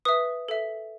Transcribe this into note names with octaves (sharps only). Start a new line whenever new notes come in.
B4 E5 D#6
A4 E5